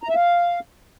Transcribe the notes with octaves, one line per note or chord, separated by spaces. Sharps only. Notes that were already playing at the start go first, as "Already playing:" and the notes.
A#5
E5
F5